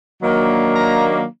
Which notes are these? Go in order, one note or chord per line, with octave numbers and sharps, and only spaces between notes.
D#3 F#3 A#3 D4
A#5